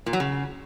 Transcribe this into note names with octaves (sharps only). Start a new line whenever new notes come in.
A#2
F#3
C#3